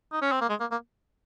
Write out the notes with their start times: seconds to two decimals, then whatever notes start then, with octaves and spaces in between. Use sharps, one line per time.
0.12 D#4
0.22 C#4
0.32 C4
0.41 A#3
0.50 G#3
0.60 A#3
0.71 A#3